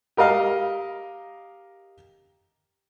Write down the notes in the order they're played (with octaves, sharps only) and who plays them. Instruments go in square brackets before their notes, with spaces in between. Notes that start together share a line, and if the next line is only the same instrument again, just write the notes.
[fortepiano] G4 A#4 D#5 F5